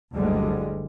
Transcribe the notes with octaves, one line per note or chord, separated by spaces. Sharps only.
F#1 D2 D3 G3 G#3